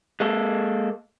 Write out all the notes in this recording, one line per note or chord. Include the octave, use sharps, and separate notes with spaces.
G#3 A#3 A4